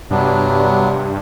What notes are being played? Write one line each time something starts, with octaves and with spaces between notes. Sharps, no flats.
G2 C3 F#3 B3 D4